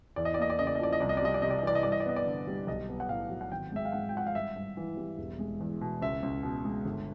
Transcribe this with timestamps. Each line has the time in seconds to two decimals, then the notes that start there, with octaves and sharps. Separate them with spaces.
0.16 E2 D5
0.25 D#5
0.34 D5
0.38 A#3 D#5
0.50 D5
0.59 C#3 D#5
0.67 D5
0.75 D#5
0.80 F3 D5
0.93 D#5
1.00 C2 D5
1.09 D#5
1.17 D5
1.22 G3 D#5
1.34 D5
1.42 C3 D#5
1.51 D5
1.59 D#5
1.63 E3 D5
1.75 D#5
1.83 G2 D5
1.92 D#5
2.00 D5
2.06 B3 D#5
2.16 D5
2.25 D3
2.47 G3
2.67 B1 D#5
2.89 B3
3.00 F#5
3.09 A2 F5
3.30 F#3
3.41 F#5
3.52 G#1 G5
3.72 G#3 E5
3.85 F5
3.92 G#2 F#5
4.09 G5
4.14 F3 F#5
4.27 F5
4.35 G2 E5
4.56 G2
4.77 E3
4.97 G3
5.18 E1
5.39 G#3
5.60 E2
5.81 B2
6.01 C#2 E5
6.23 C#2
6.43 B2
6.65 G#3
6.85 G1